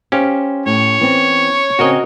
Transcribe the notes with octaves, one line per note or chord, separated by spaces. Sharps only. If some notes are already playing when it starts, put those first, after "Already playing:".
C#4 G4 C5 F5
A2 C#5
E3 B3 C4
C#3 C4 F#4 A#4 D#5